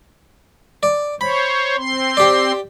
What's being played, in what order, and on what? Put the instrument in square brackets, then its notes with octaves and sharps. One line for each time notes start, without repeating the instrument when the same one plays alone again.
[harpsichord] D5
[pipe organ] C5 C#5 [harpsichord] B5
[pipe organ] C4 C6
[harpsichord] G4 D5